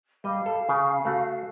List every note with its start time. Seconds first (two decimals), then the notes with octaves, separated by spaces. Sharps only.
0.24 G3 D#5 F5
0.46 A4
0.69 C#3
1.05 A3 F#4